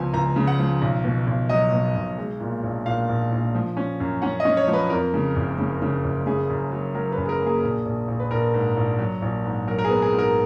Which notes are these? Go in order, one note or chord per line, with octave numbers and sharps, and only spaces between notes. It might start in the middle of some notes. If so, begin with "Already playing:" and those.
Already playing: C#2 F3 B3 G#5
C#2 A#5
C#3
F#5
F3
B1
B2
B1
F#3 D#5
B2
B1
G#3
A#2
A#1
A#2 F5
A#1
A#1
F3
C#4
F#2
C#4 F#5
D#5
C#4
C#5
F3
B4
F2 A#4
C#3
F#1
C#3
C#3
F#1
C#3 G#4
F#2
F#3
F#3 A#4
B4
F#2
G#4
A#4
A#3
G#4
A#1
A#1
A#1
B4
A#1 A#4
G#2
A#1
F#3
A#1
G#2
F#3 A#4
A#4
G#4
B3
G#4
G#2
A#4